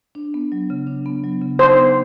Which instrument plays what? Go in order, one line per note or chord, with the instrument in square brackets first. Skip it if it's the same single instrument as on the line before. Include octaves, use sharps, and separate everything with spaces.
[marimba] D4
B3
F#3
C#3
D4
B3
F#3
C#3
[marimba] D#4 [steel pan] C5
[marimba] B3